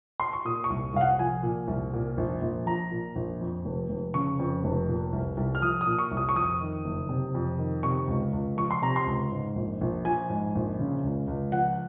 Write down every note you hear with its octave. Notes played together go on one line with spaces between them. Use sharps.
C6
C#6
A#2 D#6
C#6
C2
C2 F5
F#5
F3 G#5
A#2
C2
A#2
A#1
A#1
F3 A#5
A#2
A#1
F2
F1
F1
C#3 C#6
F2
F1
A#2
C2
C2
F6
F3 D#6
D#6
A#2
C#6
C2
D#6
C#6
F2 D#6
D#3
F#1
C3
F2
D#3
C3 C#6
C#2
C#2
F3 C#6
C6
C3 A#5
C6
C#2
G#2
A#1
A#1
F3 G#5
G#2
A#1
C#3
C#2
C#2
F3 F#5